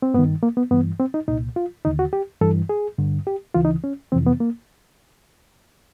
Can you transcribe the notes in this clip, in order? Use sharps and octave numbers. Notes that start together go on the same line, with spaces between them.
C4
G2 D#3 B3
A#3
B3
G2 E3 B3
C4
D#4
C2 A#2 D#4
F4
D#2 D3 D#4
F#4
G4
G2 E3 A4
G#4
G2 D3
G4
D2 C#3 E3 F4
D#4
C#4
F2 C3 E3 C4
B3
A#3